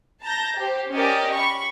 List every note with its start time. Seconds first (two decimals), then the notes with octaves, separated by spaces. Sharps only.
0.22 A5 A#5 G6 A#6
0.56 G4 C5
0.91 C#4 G4 A#4 D5 D#5
1.35 B5 C#6